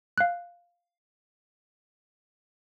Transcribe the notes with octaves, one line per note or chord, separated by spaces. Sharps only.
F5 F#6